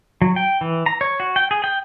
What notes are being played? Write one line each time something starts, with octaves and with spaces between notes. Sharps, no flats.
F#3
G5
E3
A#5
C#5
F#4
G5
G#4
G5